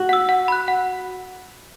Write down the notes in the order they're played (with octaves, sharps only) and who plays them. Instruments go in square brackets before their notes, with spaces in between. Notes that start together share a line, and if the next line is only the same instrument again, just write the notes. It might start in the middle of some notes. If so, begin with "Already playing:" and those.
Already playing: [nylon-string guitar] F#4
[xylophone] F#5 E6
F#5
B5 F#6
F#5